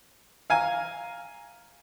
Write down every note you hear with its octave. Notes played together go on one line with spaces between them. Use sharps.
F5 G#5 A#5